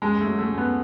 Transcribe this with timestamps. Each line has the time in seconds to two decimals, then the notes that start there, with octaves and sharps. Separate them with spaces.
0.02 F#2 G#3
0.21 A3
0.26 F#3
0.39 A3
0.51 F#2
0.58 B3